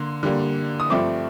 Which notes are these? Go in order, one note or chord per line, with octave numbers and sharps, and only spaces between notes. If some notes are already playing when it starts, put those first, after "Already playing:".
Already playing: D3 A#3 C6
D3 G3 A#3
D#6
G2 F3 A3 C4 D6